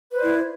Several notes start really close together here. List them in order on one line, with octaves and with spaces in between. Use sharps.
B4 C5 D5 E4